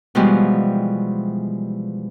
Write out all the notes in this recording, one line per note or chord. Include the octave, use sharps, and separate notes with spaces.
B2 E3 F3 G3 G#3